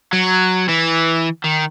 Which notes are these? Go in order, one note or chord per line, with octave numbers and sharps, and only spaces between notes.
F#3
E3
D#3